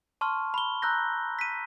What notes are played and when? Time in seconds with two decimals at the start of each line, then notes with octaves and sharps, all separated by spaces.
0.21 A5 C6 C#6 F6
0.54 B5 G7
0.82 A#5 E6 F#6 G6 A#6
1.39 B6 D#7